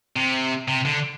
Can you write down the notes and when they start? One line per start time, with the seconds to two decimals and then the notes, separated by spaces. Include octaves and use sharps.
0.16 C3
0.68 C3
0.86 D3